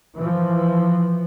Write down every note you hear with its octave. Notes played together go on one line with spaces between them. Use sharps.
E3 F3